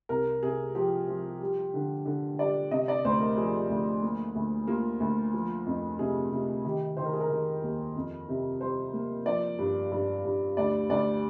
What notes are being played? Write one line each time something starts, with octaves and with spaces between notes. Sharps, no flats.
C2 A#4
C3 G#4
F3 G4
F3
G3
D3
D3
G3 D5
C3 D#5
D5
D2 C5
A#4
F3 G#4
D2
A#3
D2
A#3 F4
D2
F3
F2
C3 G#4
C3
D#3 G4
D#3 C5
A#4
G#4
A#4
D#3
D#2
F2
C3
G3 C5
A#3
F3 D5
G2
G2
G2
D2 D5
D2 D5